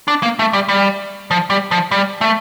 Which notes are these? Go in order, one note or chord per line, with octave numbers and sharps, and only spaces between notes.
D4
A#3
A3
G3
G3
F3
G3
F3
G3
A3